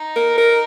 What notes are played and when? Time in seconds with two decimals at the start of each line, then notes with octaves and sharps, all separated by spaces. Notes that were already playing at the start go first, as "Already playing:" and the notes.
Already playing: D#4
0.16 A#4
0.38 A#4